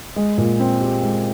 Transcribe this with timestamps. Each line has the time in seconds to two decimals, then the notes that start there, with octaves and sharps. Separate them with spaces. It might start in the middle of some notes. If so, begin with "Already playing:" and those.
0.16 G#3
0.38 A#2
0.59 C4
0.81 G4
1.02 G#3